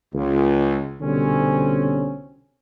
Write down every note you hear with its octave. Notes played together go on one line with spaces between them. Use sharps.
C#2
C2 B2 D3 C4 C#4